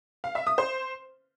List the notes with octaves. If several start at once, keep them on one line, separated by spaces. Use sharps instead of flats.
F5
E5
D#6
C5